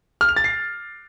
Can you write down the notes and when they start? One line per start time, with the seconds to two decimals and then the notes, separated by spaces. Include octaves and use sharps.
0.21 F6
0.29 F7
0.36 A6
0.44 C7